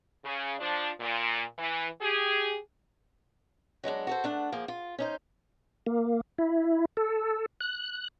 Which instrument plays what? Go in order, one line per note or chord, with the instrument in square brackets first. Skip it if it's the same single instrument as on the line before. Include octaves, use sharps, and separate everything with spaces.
[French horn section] C#3
F3 D4
A#2
E3
G4 G#4
[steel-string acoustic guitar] F#3 G#3 B3 D4
F#4 A4 C5
A3 D4 F#5
F3 A#3 G#4
F4
C#4 D#4 C5
[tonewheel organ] A#3
E4
A4
F#6